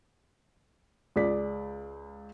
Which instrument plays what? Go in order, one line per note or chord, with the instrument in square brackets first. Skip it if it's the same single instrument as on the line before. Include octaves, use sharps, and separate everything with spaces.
[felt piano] C#2 G#4 D5 B6